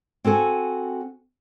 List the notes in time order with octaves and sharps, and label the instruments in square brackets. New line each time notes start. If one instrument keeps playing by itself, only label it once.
[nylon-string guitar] C4 F#4 A4 G#5